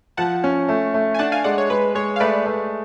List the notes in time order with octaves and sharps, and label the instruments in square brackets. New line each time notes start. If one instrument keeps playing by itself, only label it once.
[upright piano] F3 [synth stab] F#5 A5
[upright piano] C#4
A3
A3
[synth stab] G#5
[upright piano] D4 [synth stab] F#5 A5
[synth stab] F5 G#5
[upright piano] G#3 [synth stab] D5 F#5
[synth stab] C#5
[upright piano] G#3 [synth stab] B4
[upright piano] G#3 [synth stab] C#5
[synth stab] F5
[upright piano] A3 [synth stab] B4 D5
[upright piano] A3